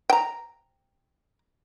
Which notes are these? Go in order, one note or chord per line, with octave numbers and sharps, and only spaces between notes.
G5 A#5